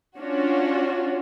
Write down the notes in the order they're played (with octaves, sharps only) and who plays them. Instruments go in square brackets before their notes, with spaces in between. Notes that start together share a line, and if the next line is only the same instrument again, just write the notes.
[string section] C#4 D4 F4 F#4 C#5